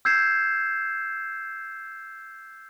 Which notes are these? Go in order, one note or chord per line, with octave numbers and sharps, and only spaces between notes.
E6 G6 G#6 C7 E7